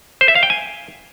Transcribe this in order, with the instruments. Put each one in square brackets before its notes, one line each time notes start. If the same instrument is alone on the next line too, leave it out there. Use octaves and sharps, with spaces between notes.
[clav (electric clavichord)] C5
E5
F5
G5
G#5